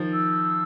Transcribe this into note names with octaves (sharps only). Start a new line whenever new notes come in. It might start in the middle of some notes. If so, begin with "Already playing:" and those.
Already playing: D#3 F3
E6